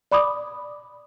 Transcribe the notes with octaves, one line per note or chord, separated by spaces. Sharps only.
D5 B5 D6 D#6